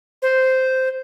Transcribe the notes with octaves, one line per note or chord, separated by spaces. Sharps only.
C5